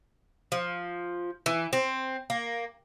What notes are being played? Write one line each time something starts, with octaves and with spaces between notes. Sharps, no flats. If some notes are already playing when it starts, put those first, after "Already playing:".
F3
E3
C4
A#3